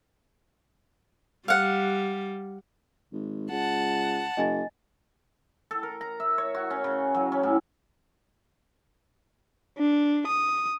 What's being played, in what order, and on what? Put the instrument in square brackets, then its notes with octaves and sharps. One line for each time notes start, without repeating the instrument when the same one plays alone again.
[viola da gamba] G3 [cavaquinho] F5 F#5
[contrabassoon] G#1
[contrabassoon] C#2 [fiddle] F#5 A5
[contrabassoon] F#1 [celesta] D#5 G#5 A6
[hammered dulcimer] A4
A#4
A#5
E5
C#5
F#4
C#4
C#3
F#3
C#4
A2
[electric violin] D4
D#6